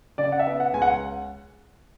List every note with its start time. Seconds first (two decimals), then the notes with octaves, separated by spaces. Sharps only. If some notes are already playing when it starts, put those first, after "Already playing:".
0.18 C#3 D5
0.32 F#5
0.39 E5
0.47 B3
0.60 F#5
0.74 C#2 G#5
0.82 F#5